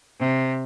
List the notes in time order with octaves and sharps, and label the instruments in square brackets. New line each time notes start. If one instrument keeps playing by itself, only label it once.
[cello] C3